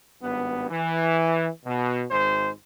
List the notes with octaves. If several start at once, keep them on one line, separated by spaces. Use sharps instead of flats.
G#1 G2 B3
E3
B2
G#1 G#2 C5